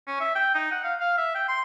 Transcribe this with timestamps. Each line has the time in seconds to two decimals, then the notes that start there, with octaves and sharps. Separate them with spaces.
0.07 C#4
0.20 E5
0.36 G5
0.55 D#4
0.71 F#5
0.84 F5
1.00 F5
1.18 E5
1.35 G5
1.49 C6